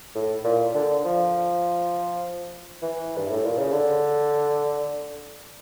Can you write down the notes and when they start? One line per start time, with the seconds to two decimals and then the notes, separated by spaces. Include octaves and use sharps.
0.15 A2
0.44 A#2
0.74 D3
1.05 F3
2.82 E3
3.18 G2
3.30 A2
3.45 A#2
3.58 C#3
3.72 D3